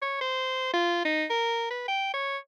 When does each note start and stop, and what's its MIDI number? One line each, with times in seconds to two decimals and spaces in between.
0.02 0.17 73
0.21 0.72 72
0.74 1.02 65
1.05 1.25 63
1.30 1.69 70
1.70 1.87 71
1.88 2.09 79
2.14 2.37 73